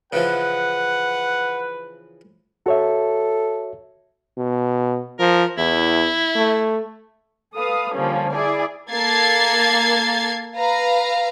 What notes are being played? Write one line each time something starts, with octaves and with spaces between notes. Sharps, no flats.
C#3 E3 F3 B4 F#5
F#4 A4 C#5 E5
B2
F3 A#4
E2 E4
A3
A4 B4 F5 D#6
D3 F3 G3 A#3 C#4
E4 G#4 D5 G#5
A#3 A4 G#6 A6 C7
B4 F5 A#5